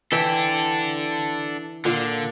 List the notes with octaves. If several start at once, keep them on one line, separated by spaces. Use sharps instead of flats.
E3 D4 A4 E5 G5
A#2 D3 F5